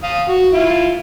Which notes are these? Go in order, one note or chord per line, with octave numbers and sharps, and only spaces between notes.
F5 D#6
F#4
E4 F4